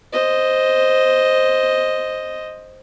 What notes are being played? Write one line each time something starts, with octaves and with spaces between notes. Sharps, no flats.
C5 D#5